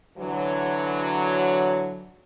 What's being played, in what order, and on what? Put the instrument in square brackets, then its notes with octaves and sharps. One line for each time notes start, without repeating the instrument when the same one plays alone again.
[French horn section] D3 E3 F#3